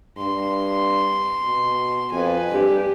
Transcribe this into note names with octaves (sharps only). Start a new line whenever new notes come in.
G2 C6
B2
F2 B4 G#5
G2 G4